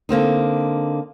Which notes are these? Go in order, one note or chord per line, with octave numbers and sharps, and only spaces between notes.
D3 A#3 C4 D#4